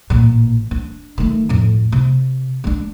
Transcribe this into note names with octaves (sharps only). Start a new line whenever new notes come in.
A1 A#2
D4
D#3 A3
F2 A2
C3
G#3 D4